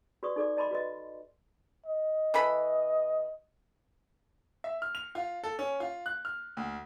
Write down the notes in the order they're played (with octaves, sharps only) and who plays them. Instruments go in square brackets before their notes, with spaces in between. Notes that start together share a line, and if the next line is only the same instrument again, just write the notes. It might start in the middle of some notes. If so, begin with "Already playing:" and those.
[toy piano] F#4 B4 D5 C#6 D#6
D#4 A4 D5 D6
D5 D#5 A5 B5 C6 D6
F#4 B4 D#5
[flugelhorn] D#5
[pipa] E3 A4 B5
[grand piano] E5
F6
F7
F4
A4
C#4
F4
F#6
F6
D2